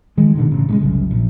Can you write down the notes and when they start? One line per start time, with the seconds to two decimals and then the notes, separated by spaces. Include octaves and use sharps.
0.17 D#3 G#3
0.35 B2 D3 D#3
0.51 A1 C#3
0.69 G2 C#3 G#3
0.81 F#1 C2 F#2
1.11 A#1